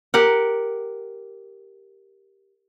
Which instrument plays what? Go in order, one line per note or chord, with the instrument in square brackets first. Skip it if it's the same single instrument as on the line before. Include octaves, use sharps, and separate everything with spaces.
[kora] G4 A#4 F#5